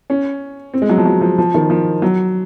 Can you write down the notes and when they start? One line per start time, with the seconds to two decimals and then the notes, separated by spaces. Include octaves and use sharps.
0.10 C#4
0.74 C4
0.82 G#3
0.89 F#3
0.98 F3
1.05 F#3
1.21 F3
1.38 F3
1.54 D#3
1.70 F3
2.02 F#3